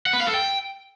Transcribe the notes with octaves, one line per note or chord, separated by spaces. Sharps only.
F#5
B4
F5
A4
G5